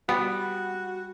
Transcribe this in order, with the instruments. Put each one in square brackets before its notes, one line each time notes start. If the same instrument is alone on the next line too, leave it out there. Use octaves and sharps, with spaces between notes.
[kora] G3 [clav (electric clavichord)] B3 [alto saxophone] F#4